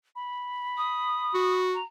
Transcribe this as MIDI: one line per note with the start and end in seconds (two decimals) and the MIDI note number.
0.15 1.67 83
0.77 1.55 87
1.34 1.78 66
1.74 1.83 82